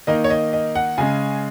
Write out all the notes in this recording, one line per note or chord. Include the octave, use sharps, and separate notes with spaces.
D#3 A#3 D#4 D#5
C#5
D#5
D#5
F#5
C#3 G#3 C#4 G#5